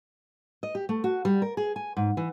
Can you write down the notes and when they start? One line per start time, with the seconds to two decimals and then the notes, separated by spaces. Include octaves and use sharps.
0.63 D#5
0.75 G4
0.89 A3
1.04 F#4
1.25 G3
1.42 A#4
1.57 G#4
1.76 G#5
1.97 G#2
2.17 E3